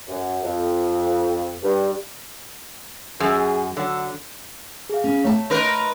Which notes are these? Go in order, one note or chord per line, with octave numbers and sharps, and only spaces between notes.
F#2
F2
G2
F#2 G#4
D3 F#3
G#4 F5
C#4
A3 C#5 E5 A5
D#4 A#4 B4 C6